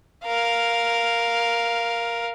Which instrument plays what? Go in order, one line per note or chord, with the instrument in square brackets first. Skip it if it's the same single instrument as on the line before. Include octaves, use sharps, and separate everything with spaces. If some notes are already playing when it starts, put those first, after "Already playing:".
[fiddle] A#4 F5